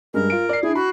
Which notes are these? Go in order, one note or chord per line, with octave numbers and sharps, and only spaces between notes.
G2 G#3 A#4
F4 D7
D5 C7
D4 E4 G#4
F#4 B5